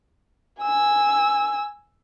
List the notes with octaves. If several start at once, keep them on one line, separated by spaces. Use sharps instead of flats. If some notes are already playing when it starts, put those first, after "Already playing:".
G#5 E6